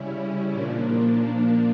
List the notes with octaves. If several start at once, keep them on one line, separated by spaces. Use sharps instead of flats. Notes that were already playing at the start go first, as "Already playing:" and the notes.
Already playing: C#3 G3 C#4 E4
A#2 F3 A#3 D4